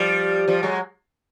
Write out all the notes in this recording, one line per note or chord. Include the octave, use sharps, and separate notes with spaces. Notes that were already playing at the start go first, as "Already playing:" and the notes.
Already playing: F3 G3
F3 G3
F#3 G#3